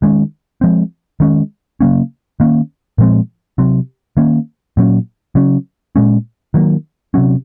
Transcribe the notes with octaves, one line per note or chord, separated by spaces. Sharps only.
D#3 G#3 C#4
F3 G#3 C4
D#3 G#3 C#4
C#3 F#3 A#3 C#4
D#3 A#3 C#4
A#2 F3 G#3 C4
C3 F#3 C4
D#3 A#3 C#4
A#2 F#3 C#4
C#3 F#3 C#4
A#2 G#3 C#4
D#3 F#3 A#3
C3 F#3 C#4